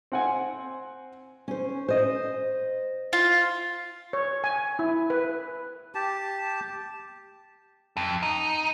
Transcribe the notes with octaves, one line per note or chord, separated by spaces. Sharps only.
C4 F#5 G#5
C#4 C5
C5 D#5
F4
C#5
G#5
E4
B4
G4 A5
F2
D#4